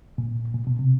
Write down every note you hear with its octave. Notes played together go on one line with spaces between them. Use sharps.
A#2
A#2
B2
C3